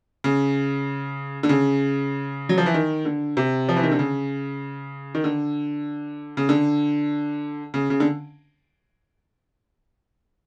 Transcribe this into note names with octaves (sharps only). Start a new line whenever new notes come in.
C#3
D3
C#3
F#3
F3
E3
D#3
D3
C3
F3
E3
D#3
D3
C#3
D#3
D3
C#3
D3
C#3
C#3
D3